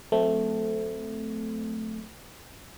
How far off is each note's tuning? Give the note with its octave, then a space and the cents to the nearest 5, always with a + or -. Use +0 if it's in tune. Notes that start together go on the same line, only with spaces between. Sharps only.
F#3 -40 A3 +0 C4 -20